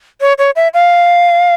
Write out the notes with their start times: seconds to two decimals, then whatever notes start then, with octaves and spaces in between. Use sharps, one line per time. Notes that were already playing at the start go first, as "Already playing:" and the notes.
0.21 C#5
0.38 C#5
0.56 E5
0.74 F5